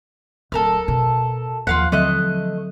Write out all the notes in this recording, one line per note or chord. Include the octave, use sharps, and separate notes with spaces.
D1 A4 A#4 F6
B2
D#2 F3 F4 F5 F#5
D3 F#3 A3 C4 D#5 F#6